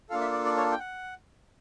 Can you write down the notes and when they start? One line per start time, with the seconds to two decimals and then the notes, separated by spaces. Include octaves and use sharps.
0.10 A#3 D4 F4 A4 F5
0.21 E5
0.33 D5
0.45 D5
0.57 C#5
0.71 G5
0.80 F#5